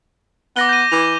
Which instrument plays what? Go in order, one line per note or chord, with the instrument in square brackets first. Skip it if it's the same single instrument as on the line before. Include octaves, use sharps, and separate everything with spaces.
[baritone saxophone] B3 [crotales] D6 A#6 G7
[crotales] G6 A#6 D#7
[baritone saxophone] E3 [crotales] D6 F7